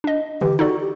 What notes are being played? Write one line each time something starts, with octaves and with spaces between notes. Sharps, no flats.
D4 D#5
D3 E3 G4
D#4 F#4 A4 D5
G4